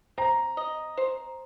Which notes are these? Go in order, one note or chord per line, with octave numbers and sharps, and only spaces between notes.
C4 A#5
D#5
C5